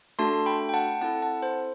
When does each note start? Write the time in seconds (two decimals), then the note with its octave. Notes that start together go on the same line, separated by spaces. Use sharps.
0.19 A3 D4 F#4 A4 A5 C6
0.46 G5 B5
0.69 G5
0.74 F#5 A5
1.01 C4 E4 A4 F#5 A5
1.22 F#5 A5
1.42 C5